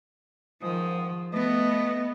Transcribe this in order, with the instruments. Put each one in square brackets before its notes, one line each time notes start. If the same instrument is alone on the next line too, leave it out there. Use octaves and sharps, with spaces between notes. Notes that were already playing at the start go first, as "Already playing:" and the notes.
[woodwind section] G#2 D#3 D#6 [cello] F3
[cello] A3 B3 [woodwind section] B4 D#5